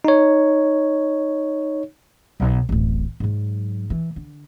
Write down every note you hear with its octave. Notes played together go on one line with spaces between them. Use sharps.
D#4 C#5
B1
D1 A1
G#2 F#3
E3
D3